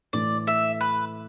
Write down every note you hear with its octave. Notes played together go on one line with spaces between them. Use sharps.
A2 E3 A3 E4 D5
E5
B4